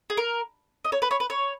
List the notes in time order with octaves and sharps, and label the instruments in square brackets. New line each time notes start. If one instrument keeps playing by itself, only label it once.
[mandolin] G#4
A#4
D#5
C#5
B4
C#5
B4
C#5